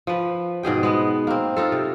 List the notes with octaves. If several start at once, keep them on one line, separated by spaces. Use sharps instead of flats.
F3 B4
G#2 B2 G#4 G5
G#3 B3
A#3 C4
D#4 F4 A4
C3